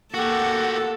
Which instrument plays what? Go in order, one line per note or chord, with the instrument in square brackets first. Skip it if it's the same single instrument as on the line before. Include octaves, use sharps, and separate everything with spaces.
[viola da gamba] A#3 A4 [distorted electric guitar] F#4 G4 [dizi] F#5